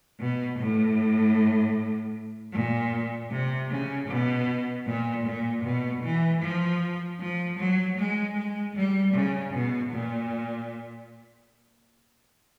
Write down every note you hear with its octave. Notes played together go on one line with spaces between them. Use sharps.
B2
A2
A#2
C3
C#3
B2
A#2
A#2
B2
E3
F3
F3
F#3
G#3
G#3
G3
C#3
B2
A#2